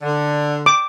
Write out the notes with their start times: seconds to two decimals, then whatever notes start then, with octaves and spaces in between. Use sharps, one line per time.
0.02 D3
0.66 D6